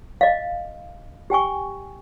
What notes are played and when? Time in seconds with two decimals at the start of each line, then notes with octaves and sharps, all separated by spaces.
0.21 D#5 F5
1.30 G4 G5 G#5 C#6